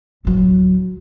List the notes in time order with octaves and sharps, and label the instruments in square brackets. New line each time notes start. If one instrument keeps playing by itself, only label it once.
[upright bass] D1 F#3